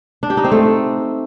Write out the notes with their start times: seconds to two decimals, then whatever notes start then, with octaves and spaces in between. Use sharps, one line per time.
0.23 D4
0.30 G4
0.37 D#4
0.44 C4
0.52 A3